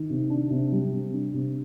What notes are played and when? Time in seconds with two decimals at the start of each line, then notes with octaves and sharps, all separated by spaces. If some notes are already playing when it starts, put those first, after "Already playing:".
Already playing: D#3
0.10 C3
0.30 D4
0.50 C3
0.72 G3
0.92 C3
1.14 D4
1.34 C3